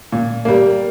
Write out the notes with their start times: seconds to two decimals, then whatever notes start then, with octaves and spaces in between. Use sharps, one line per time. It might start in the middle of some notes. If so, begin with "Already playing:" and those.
0.12 A#2
0.45 G3 A#3